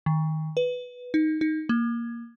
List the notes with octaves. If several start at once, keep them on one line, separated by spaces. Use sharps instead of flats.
D#3
B4
D#4
D#4
A#3